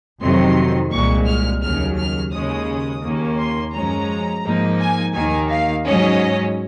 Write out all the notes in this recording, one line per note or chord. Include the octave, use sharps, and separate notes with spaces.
F2 C3 D#3 F#3 C6
C2 A#2 G#3 C#6
F6
D#2 C#3 F#3 F6
F6
D#2 C#3 G#3 C#4 D#6
D#2 D#3 A#3 C#4
C6
F#2 F3 G#3 C#4 A#5
G#2 F3 A#3 D#4
G#5
D#2 D#3 A#3 G#5
F5
G#2 F#3 C#4 D#5